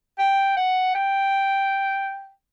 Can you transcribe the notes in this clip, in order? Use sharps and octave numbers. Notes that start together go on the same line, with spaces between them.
G5
F#5
G5